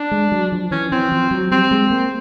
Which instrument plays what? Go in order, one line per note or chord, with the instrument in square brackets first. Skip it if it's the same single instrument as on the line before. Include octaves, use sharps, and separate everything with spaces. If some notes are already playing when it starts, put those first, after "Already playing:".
Already playing: [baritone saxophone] D4
[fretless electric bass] G#3
F#3
F3
[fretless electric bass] E3 [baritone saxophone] C#4
[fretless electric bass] E3 [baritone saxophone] C4
[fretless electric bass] F3
F#3
[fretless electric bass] G3 [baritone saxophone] C4
[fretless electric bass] G#3
A#3